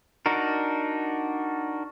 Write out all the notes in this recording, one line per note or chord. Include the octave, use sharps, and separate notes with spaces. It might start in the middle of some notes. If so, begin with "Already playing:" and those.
D4 D#4 F#4 A#4